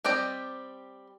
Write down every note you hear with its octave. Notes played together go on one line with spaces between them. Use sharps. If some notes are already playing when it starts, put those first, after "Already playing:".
G3 C4 G4 D5 D#5